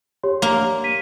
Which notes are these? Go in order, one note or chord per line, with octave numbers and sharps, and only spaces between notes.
G4 C#5 C6
A#3
B6 D#7